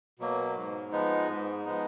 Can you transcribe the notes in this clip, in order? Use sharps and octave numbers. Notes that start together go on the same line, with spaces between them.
B2 F#3 A#3
G#2
F3 G#3 B3 D#4
G#2
F3 G#3 B3 D#4